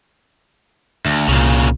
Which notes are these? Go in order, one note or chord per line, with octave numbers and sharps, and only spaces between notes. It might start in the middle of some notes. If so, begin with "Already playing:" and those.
D2
C2 A#2 C#3